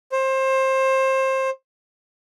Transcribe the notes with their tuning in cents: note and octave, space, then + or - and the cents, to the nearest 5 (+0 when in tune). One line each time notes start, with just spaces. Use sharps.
C5 +25